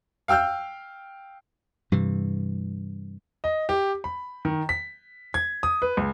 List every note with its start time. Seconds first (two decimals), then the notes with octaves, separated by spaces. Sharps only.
0.28 F5 G5 E6 F6 G6
1.92 G2 C3 E3
3.44 D#5
3.69 G4
4.04 B5
4.45 D#3
4.69 B6
5.34 G#6
5.63 D#6
5.82 B4
5.97 C#2